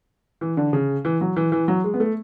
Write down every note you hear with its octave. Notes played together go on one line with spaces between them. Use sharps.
E3
D3
C#3
E3
F#3
E3
E3
F#3
G#3
B3
A3